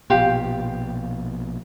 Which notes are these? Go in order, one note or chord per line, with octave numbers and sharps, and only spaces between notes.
A#1 B2 F4 G4 F5